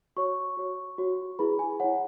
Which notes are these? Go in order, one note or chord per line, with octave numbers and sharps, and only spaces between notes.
F#4 C#5 C#6
F#4 C#5
F#4 C#5
E4 G#4 B4 B5
G#5
E4 C#5 F#5